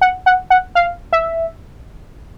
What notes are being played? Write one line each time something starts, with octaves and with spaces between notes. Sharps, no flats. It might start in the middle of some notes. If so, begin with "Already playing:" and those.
F#5
F#5
F#5
F5
E5